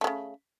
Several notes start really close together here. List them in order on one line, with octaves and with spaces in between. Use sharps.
A3 G#3 C#3